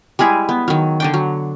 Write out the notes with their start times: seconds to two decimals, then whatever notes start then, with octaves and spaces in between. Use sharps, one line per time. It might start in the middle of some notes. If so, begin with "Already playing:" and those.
0.19 G3 G#3 E4 G#4
0.49 B3
0.68 D#3 F#3
1.00 D3 D4 G5
1.14 F#3